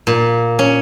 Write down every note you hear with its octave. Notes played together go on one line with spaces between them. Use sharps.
A#2
C#4